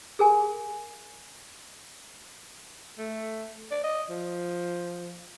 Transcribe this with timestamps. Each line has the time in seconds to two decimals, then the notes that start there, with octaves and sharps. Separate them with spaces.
0.19 G#4 A#4 G#5
2.99 A3
3.71 D5
3.84 D#5
4.10 F3